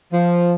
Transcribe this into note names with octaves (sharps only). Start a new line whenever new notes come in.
F3